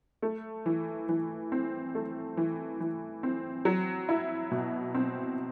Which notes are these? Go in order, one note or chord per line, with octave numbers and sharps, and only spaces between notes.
A3
E3
E3
C4
A3
E3
E3
C4
F#3
E4
B2
C4